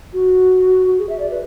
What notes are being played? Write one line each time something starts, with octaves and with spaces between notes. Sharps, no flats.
F#4
G#4
E5
D5
B4